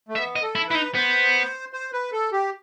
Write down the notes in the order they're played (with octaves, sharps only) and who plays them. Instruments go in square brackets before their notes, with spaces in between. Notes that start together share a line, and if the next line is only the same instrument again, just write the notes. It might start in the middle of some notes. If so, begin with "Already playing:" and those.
[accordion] A3
[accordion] B3 [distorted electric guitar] E5
[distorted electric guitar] D#5
[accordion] A4
[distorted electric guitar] E4
[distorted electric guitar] E4 [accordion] B4
[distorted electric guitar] D#4
[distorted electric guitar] B3 [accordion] C5
[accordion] C5
B4
A4
G4